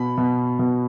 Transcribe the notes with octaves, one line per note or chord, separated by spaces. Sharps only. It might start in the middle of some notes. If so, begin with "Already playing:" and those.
Already playing: B2 B5
B2
B2